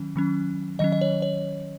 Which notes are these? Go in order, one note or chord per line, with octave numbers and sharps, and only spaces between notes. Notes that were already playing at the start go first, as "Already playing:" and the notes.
Already playing: D#3 F#3 C#4
D#3 F#3 C#4
D#3 F#3 C#4 D#5
D#5
C#5
C#5